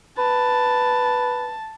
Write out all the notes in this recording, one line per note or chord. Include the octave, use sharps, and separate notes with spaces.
B4 A5